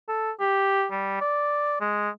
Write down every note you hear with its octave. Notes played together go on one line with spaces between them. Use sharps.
A4
G4
G3
D5
G#3